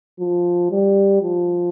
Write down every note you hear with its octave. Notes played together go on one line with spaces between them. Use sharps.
F3
G3
F3